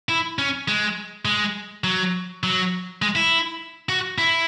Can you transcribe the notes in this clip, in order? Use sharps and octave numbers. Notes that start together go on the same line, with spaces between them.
E4
C#4
G#3
G#3
F#3
F#3
G#3
E4
F#4
E4